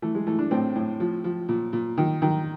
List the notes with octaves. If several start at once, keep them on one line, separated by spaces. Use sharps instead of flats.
E3 A3
G#3
E3 A3
D4
A2 C4
A2
F3
F3
A#2
A#2
D#3
D#3